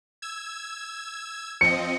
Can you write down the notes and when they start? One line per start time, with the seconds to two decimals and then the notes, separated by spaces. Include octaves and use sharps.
0.22 E6 G#6
1.61 F3 C4 D#5 C#7